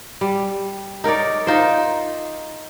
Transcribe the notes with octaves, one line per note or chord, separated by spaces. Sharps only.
G3
D#4 A#4 C#5 D5
D#4 F4 C5